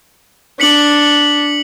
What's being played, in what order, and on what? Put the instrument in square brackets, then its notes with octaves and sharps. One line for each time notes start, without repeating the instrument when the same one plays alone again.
[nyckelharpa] D4 [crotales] B6 C#7 F#7